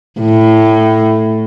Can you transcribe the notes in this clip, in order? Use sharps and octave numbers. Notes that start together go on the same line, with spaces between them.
A2